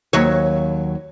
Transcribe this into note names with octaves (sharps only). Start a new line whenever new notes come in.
D#2 F#3 C#5